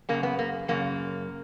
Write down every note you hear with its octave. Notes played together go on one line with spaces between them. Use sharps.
F#2 C#3 A#3
B3
A#3
F#2 C#3 A#3